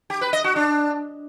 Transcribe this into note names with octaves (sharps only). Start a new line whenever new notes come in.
G4
B4
D#5
F#4
D4